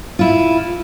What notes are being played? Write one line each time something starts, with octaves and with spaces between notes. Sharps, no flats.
E4 F4